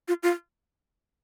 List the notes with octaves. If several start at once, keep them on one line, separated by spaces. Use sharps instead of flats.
F4
F4